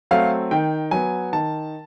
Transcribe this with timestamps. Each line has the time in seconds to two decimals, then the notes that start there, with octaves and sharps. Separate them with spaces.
0.11 F#3 A3 C4 F5
0.51 D#3 G5
0.91 F#3 B3 G#5
1.33 D#3 A5